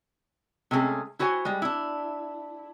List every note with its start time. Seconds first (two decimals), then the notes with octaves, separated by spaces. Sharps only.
0.71 C3 G#3 A3 C#4 G#4
1.19 E4 F#4 C5 C#5 G#5
1.45 G3 G#3
1.62 D4 E4